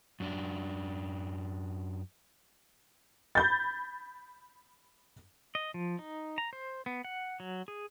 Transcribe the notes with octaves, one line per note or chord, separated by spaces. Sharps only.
F#2 D4
B5 G6 A6
D#5
F3
D#4
A#5
C5
B3
F#5
F#3
G#4